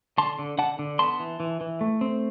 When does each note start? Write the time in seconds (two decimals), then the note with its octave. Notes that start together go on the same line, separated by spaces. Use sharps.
0.18 D3 A5 C6
0.39 D3
0.58 D3 F#5 A5
0.79 D3
0.99 B3 A5 C6
1.20 E3
1.40 E3
1.61 E3
1.81 A3
2.01 C4